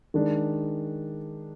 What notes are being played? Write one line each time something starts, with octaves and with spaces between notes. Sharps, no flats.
D#3 G#3 D4